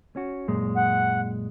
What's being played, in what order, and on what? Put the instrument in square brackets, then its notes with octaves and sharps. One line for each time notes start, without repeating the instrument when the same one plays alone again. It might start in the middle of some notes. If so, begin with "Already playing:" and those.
[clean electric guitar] C#4 F#4
F#2 A#2 G#3
[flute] F#5